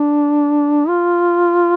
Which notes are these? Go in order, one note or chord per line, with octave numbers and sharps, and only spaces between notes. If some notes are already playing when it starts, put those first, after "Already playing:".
Already playing: D4
F4